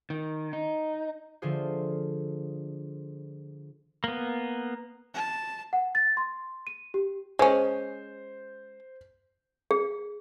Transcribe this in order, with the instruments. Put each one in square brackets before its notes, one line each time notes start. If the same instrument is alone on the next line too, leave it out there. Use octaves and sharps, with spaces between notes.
[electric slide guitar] D#3
D#4
[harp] D3 F3 A3 F4 G#4 C5
[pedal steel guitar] A#3 B3
[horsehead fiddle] A5
[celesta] F#5
A6
C6
D#7
G4
[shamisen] G#3 C#4 [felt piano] C5
[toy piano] G#4